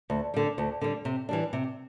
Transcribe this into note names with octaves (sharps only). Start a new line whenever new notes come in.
D2
D3 G3
D2
D3 G3
C3
E3 G3 D4
C3